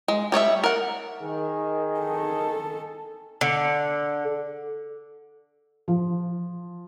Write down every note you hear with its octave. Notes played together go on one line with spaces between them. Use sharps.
G#3
G3 C#5 D5 E5
A#4 F#5
D#3 G#4
A4
D3
F3